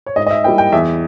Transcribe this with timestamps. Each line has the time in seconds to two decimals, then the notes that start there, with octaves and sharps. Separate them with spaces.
0.06 C#5
0.16 G#2 D#5
0.27 D#5
0.31 E5
0.44 G3 A#3 E4 G5
0.58 G5
0.72 E2 E5